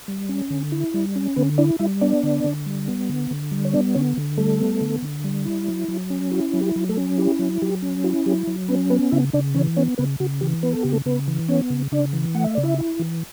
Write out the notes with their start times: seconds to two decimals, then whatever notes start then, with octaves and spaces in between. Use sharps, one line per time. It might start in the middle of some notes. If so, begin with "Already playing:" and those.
0.08 G3
0.29 C#4
0.50 D3
0.72 E4
0.94 G3
1.16 C#4
1.36 D3 B3 B4
1.58 D4 E4 D5
1.79 G3 E4 E5
2.01 B3 D4 D5
2.23 D3
2.44 D3
2.66 G3
2.88 B3
3.09 D3
3.31 D3
3.51 G3
3.65 C#5
3.73 B3 D4 D5
3.95 D3 C#4 C#5
4.17 D3
4.38 G3 A3 A4
4.60 B3
4.81 D3
5.02 D3
5.24 G3
5.45 E4
5.68 F#3
5.88 F#3
6.10 C#4
6.31 E4 F#4
6.53 F#3
6.61 G4
6.76 F#3
6.89 A3 A4
6.97 C#4
7.18 E4 G4
7.39 F#3
7.62 F#3 G4
7.82 C#4
8.04 E4 F#4
8.26 F#3 G4
8.47 F#3
8.68 B3 C#4 B4
8.90 B3 B4
9.12 C#3 E4 E5
9.33 C#3 D4 D5
9.55 E3 C#4 C#5
9.76 B3 C#4 C#5
9.98 C#3 B3 B4
10.20 C#3 F#4
10.41 E3 G4
10.63 B3 B4
10.73 A4
10.83 C#3 G4
10.93 A3 A4
11.06 C#3 B3 B4
11.28 E3
11.48 B3 C#4 C#5
11.70 C#3
11.92 C#3 D4 D5
12.13 E3
12.35 A3 F#5
12.44 E5
12.55 C#3 D5
12.63 E4 E5
12.78 E4
12.99 E3